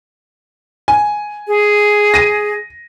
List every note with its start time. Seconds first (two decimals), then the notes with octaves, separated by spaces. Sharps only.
0.88 G#5
1.48 G#4
2.14 A#6 D#7